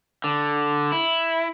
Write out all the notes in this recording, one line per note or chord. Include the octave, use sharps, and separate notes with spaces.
D3
E4